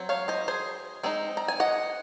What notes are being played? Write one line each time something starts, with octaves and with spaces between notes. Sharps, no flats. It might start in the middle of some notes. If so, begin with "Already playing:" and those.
Already playing: F#3 C4
C#5 F5
C5 D#5
G#4 C5
G#3 C4 D#4
A#5
G#5
D#5 F#5